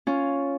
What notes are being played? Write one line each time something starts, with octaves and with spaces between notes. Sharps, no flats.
C#4 F4